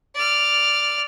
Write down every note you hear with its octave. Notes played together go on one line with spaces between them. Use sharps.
D5 F6